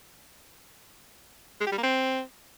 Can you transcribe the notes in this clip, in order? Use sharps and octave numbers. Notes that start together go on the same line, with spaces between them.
G#3
G4
G3
A#3
C4